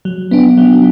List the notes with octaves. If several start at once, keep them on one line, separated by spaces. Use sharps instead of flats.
F#3
B3 D4
F#3